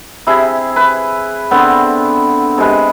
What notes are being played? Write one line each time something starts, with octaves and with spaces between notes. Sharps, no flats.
C3 E4 G#4
B4
D3 B3 C4
C3 G#3 B4